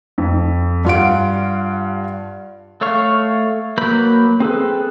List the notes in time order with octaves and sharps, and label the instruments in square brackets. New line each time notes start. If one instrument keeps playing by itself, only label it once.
[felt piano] F2
G2 F4 F#5 D7
[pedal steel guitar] A3 A4 C#5 F5 C#6
F#3 A#3 B4 B5 G6
C4 G#4 A4 B4